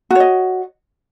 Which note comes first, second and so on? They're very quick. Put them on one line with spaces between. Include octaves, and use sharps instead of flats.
F#4 C#5 D#5